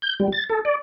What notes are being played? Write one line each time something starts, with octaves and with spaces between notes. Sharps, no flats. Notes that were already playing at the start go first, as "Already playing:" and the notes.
G6
G3
A6
A4
D5